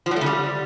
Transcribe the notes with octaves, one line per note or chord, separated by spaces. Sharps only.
F3
F#3
A3
C#3
G3